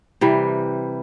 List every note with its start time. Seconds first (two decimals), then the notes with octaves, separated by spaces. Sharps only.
0.21 C3 E3 G3